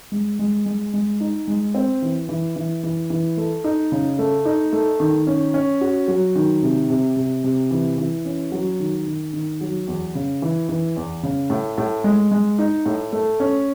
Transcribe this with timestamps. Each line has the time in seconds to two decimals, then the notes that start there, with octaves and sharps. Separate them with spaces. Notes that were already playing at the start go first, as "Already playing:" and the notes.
0.12 G#3
0.39 G#3
0.66 G#3
0.94 G#3
1.20 D#4
1.47 G#3
1.75 C4
2.02 E3
2.29 E3
2.56 E3
2.83 E3
3.10 E3
3.37 A3
3.64 D#4
3.92 C#3
4.19 A3
4.45 D#4
4.73 A3
5.00 D#3
5.27 C#4
5.54 C#4
5.81 F#4
6.08 F#3
6.35 D#3
6.63 C3
6.90 C3
7.16 C3
7.44 C3
7.71 E3
7.98 E3
8.25 C#4
8.52 F#3
8.80 D#3
9.07 D#3
9.33 D#3
9.61 F#3
9.87 E2
10.15 C#3
10.42 E3
10.69 E3
10.96 E2
11.23 C#3
11.50 A2
11.78 A2
12.04 G#3
12.31 G#3
12.59 D#4
12.86 A2
13.13 A3
13.40 C#4